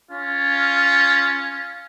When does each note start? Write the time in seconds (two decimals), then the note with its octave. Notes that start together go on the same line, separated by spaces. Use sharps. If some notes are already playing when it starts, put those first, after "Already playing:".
0.12 C#4 F4